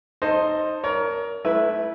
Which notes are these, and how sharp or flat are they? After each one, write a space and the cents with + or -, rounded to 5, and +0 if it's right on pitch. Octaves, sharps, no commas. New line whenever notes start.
D#4 +0 A4 +15 C5 +10
A#4 +10 C#5 +35
A3 -30 E4 +0 B4 -15